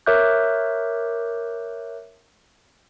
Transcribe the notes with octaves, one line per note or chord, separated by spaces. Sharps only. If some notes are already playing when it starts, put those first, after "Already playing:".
A#4 C#5 E5 D6 F#6 G6